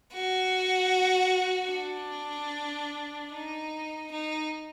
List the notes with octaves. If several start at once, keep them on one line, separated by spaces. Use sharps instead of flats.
F#4
D4
D#4
D#4